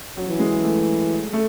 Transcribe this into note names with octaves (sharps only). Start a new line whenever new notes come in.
F#3
E3
G#3
A3
A3